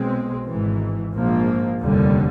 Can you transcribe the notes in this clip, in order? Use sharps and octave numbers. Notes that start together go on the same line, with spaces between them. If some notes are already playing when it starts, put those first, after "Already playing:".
Already playing: B1 B2 G#3 C4
G#1 G#2 E3
A#1 G#2 F3 A#3
F1 D#2 D3 G3